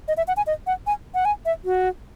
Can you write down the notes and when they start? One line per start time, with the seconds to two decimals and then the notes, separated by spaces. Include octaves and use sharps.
0.08 D#5
0.17 E5
0.28 F#5
0.37 G#5
0.47 D#5
0.67 F#5
0.87 G#5
1.14 F#5
1.25 G#5
1.45 E5
1.65 F#4